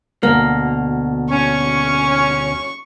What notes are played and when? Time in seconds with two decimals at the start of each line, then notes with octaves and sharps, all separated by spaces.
0.23 D2 B2 A#3
1.31 C#4 C#6